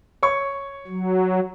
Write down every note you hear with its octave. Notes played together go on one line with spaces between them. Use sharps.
C#5 C#6
F#3